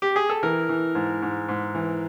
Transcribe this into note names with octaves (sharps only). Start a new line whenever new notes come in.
G4
G#4
A4
E3 A#4
E3
G#2
G#2
G#2
E3